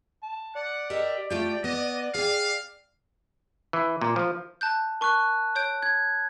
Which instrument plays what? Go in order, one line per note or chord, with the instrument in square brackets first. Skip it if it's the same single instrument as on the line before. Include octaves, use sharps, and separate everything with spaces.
[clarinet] A5
[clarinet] D5 [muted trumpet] F#5
[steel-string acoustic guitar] G4 A#4 D#5 [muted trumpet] E5
[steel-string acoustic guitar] A3 F4 G4 [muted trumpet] G5
[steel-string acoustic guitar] B3 [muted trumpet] D#5
[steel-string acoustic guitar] G#4 G5 [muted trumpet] F5
[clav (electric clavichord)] E3
A#2
F3
[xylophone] A5 F#6 G6
[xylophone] A#4 C#6 [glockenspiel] A5 F#6
[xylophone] C#5 G6 D7
[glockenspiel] G#6